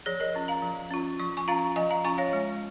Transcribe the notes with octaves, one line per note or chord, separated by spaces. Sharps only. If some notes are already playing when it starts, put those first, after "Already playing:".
F3 G#4 C#5
A#4 D#5
C#4 F4
F5 A#5
F3
C#4 F4
F3 C#6
G#5 C#6
C#4 F4 F5 A#5
F3 D#5 G#5
F5 A#5
C#4 F4 G#5 C#6
C#5 F5
G#3